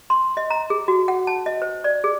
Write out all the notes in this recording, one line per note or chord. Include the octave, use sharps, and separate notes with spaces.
C6
D#5
A#5
G#4
F#4
F#5
A5
D#5
C5
D5
G#4